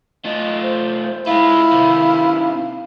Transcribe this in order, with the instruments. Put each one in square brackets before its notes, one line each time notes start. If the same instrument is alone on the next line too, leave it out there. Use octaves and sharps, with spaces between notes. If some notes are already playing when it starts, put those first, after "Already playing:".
[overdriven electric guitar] A3 F4 [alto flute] D#5
[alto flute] C5
[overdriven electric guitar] G#3 F4 [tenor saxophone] E4 [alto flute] F5
[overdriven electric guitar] C3 D#3